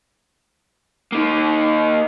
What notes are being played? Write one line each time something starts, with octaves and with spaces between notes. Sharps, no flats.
A#3 D#4